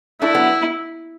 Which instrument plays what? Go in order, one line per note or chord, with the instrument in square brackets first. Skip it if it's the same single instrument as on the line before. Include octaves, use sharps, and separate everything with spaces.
[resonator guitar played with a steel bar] A3 D4 [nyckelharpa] E4
[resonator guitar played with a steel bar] F#3 B3